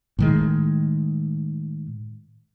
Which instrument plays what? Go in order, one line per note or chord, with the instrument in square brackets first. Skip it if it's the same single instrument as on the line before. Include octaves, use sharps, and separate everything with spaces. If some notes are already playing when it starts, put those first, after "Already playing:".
[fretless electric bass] A2 D#3 G#3